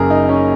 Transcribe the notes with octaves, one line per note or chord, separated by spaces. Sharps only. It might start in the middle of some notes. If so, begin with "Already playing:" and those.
Already playing: F#1 F#2 C#3 G#4 A#4
D#4
C#4